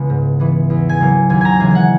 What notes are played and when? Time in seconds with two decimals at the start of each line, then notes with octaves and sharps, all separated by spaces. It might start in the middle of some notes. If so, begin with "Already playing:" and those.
Already playing: C#2 C#3 E3 G#3 B3
0.10 G#2
0.40 E3 B3
0.70 E2
0.89 G#5
1.00 C#3 F#3 A#3
1.29 D#2 G#5
1.41 G#5 A#5
1.60 C#3 E3 G#3 G#5
1.71 F#5 G#5